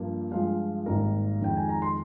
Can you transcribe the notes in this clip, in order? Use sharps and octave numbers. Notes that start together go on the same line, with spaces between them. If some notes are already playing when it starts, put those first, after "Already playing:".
Already playing: G2 F3 A#3
G2 F3 G#3 F4 F5
G#1 G#2 G3 A#3 A#4 A#5
F2 D#3 G#3 G5
G#5
A#5
C6